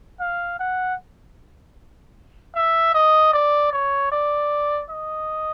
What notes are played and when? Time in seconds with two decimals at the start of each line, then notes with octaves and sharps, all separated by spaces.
0.20 F5
0.59 F#5
2.55 E5
2.94 D#5
3.33 D5
3.72 C#5
4.12 D5
4.90 D#5